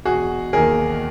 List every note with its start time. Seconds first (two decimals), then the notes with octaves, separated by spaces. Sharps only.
0.05 E1 F#4 G#4
0.53 D#2 D#3 G#4 A#4